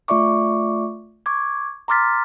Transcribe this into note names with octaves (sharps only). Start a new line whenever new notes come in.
A3 F4 D5 E5 C#6 D6
C#6 D6 G#6
A#5 C6 D6 F6 A6 B6